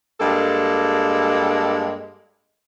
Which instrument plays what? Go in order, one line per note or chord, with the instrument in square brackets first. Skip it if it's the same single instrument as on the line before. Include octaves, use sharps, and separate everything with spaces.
[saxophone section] G2 G#3 A#3 A4